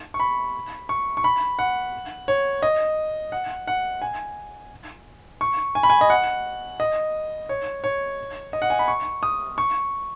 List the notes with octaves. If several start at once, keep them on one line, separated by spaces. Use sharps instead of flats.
C#6
B5
C#6
C#6
B5
F#5
C#5
D#5
F#5
F#5
G#5
C#6
G#5
B5
G#5
D#5
F#5
D#5
C#5
C#5
D#5
F#5
G#5
B5
C#6
D#6
C#6